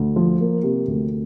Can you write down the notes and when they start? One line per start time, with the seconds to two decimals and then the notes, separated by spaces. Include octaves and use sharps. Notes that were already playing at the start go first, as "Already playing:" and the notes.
Already playing: D2
0.16 F3
0.40 A#3
0.63 C3
0.88 D2